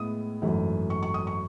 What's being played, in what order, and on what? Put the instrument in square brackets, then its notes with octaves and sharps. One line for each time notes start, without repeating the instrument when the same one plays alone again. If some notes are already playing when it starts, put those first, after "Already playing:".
Already playing: [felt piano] A2 G#3 B3 E4 D#6
G#1 F#2 E3 A3
C#6
C#6
D#6
C#6